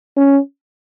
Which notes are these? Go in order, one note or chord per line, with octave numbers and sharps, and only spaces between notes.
C#4